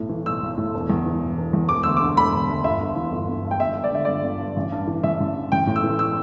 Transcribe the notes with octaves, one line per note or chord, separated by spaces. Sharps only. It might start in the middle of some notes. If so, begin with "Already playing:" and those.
Already playing: B1 A2
E3
B1 E6
B1
A2
E1
E2
E3
E1
E1
E2
E1 D6
D2 E6
D6
D3
E1 B5
E1
D2
G1 E5
G2
E3
G1
G1
G2
G5
G1 E5
G2
D5
D3 E5
G1 D5
G1
G2
A1
G2
E3
A1 E5
A1
G2
A1 G5
A2
E6
E3
E6